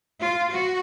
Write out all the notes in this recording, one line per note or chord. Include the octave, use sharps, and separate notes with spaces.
F4
F#4